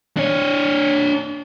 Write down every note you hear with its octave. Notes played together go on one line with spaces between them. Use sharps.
D4 C#5